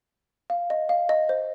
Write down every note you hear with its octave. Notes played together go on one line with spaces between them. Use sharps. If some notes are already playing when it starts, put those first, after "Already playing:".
F5
D#5
F5
D#5
C5